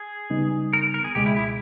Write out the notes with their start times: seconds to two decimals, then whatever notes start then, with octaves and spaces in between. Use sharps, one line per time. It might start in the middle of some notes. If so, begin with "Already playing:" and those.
Already playing: G#4
0.30 C#3 G3 B3 D#4
0.73 A#4
0.94 A#4
1.04 G#4
1.15 C#2 B2 G#3 G4
1.26 E4
1.36 E4